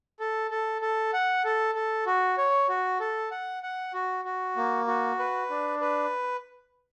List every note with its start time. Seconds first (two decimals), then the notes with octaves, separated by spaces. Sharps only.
0.20 A4
0.51 A4
0.82 A4
1.13 F#5
1.44 A4
1.75 A4
2.06 F#4
2.38 C#5
2.69 F#4
3.00 A4
3.31 F#5
3.63 F#5
3.93 F#4
4.25 F#4
4.56 A#3
4.87 F#4
5.19 B4
5.50 D4
5.81 B4